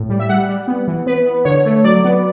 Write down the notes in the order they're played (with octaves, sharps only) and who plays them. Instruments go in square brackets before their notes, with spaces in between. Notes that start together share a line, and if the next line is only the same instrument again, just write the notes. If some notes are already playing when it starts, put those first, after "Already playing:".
Already playing: [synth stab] A2
G3
E5
G3 F#5
G3
B3
E3
B3 B4
B3
D3 C#5
A3
F#3 D5
B3